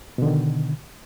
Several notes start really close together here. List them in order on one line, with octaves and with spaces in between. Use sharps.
B2 D3 D#3